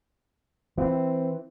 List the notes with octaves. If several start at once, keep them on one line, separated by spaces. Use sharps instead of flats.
E3 C4